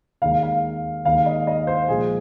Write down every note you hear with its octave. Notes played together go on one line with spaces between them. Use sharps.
D#2 D#3 G#3 F5
F5
D#2 D#3 G#3 F5
D#5
D#5
C5
A#2 F3 G#3 G#4